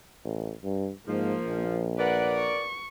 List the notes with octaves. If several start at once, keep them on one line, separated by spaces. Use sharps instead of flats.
A1
G2
G#2 F3 A#3
A#1
A#4 B4 D5 F#5
C#6